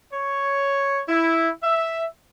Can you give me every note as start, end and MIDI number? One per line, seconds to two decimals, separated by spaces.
0.12 1.02 73
1.09 1.49 64
1.63 2.04 76